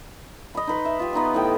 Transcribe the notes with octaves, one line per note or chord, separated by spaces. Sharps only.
D#5 B5
D#4 B4 C6
E5
F4 G4
B3 D#4 B4 C6
A2 G5